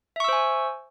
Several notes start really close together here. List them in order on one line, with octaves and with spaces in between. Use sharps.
E5 C#6 E6 C5 G#5